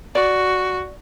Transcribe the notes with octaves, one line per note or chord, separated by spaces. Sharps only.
F#4 D5